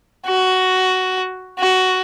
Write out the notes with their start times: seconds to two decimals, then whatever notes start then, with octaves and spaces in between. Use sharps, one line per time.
0.27 F#4
1.59 F#4